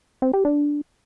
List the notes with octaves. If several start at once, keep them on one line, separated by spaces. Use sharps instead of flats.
C4
G4
D4